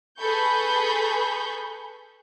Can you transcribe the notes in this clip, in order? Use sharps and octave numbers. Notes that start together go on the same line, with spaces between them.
G#4 A4 B4 B5 C#6 G6